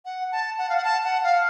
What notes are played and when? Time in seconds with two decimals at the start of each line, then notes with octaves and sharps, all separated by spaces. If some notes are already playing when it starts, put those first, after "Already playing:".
0.05 F#5
0.32 A5
0.58 F#5
0.69 F5
0.77 F#5
0.85 A5
1.04 F#5
1.24 F5